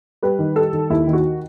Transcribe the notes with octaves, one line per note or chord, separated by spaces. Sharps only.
G3 B4
D#3
G3 A4
D#3
D#2 E4
D#3
F#4